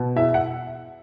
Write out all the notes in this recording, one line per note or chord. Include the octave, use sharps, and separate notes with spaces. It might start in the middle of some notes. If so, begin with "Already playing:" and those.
Already playing: B2
E2 E5
F#5